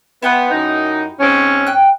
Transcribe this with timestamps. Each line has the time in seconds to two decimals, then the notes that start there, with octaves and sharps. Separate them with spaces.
0.22 B3 E4 G4 C6
0.51 F#2 D#4
1.20 G#2 C4 C#4
1.67 G5 F#6